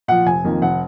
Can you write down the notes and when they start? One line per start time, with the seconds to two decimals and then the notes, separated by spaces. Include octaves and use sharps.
0.08 A#2 F3 F#5
0.26 F1 G#5
0.44 F2 D#3 A#3
0.62 F1 F#5